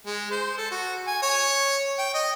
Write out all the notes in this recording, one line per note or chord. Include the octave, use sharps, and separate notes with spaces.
G#3
C5
A4
F#4
G#5
C#5
G5
D#5